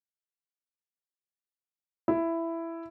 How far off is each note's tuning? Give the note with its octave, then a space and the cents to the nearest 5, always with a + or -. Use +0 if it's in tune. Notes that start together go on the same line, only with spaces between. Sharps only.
E4 +10